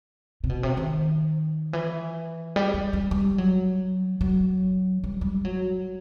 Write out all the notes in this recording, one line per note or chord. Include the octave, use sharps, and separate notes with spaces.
C3
B2
C3
D#3
E3
G3
G3
G3
G3
F#3
F#3
G3
G3
F#3